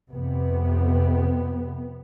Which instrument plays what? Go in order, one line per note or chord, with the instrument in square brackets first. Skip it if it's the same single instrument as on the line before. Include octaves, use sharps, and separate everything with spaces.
[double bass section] F2 C3 B3